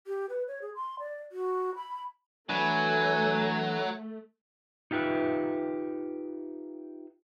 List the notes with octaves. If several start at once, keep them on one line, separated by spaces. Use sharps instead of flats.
G4
B4
C#5
G#4
C6
D5
F#4
B5
E3 F#3 A3 D4 B4 G#5
D#4 F4 G4 B4 E5